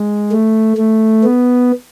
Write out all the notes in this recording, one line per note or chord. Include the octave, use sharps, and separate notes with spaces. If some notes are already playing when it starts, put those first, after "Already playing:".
Already playing: G#3
A3
A3
B3